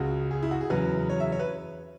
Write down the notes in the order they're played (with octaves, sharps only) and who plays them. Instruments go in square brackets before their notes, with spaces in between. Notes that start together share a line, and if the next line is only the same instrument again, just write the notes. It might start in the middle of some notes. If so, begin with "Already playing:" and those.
Already playing: [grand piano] C#2 C#3 G#3 F#4
G#4
E4
F#4
G#4
E2 C#3 F#3 B4
C#5
E5
C#5
B4